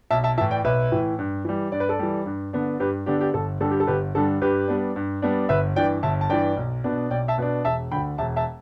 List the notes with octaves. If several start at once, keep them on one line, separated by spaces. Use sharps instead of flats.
B1 E5 A5
E5 A5
A2 E3 E5 A5
D5 G5
B1 B4 E5
A2 E3
G2
E3 G3
G2 D5
B4
A4 D5
E3 G3
G2
D3 B3 D4
G2 G4 B4
D3 B3 D4 G4
G4
G1 A4
G2 D3 G3 A4
G4
A4
G1 G4 B4
G2 D3 G3 A4
G2 G4 B4
G3 B3 D4
G2
G3 B3 D4
G1 B4 E5
G2 E3 D5 G5
G1 E5 A5
A5
G2 E3 D5 G5
B1
B2 B3 D4
B1 D5 G5
E5 A5
B2 B3 D4
E1 E5 A5
D2 D3 G5 B5
E1 E5 A5
E5 A5